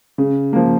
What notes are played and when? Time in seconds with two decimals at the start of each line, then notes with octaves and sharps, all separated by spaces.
0.18 C#3
0.53 F3 A#3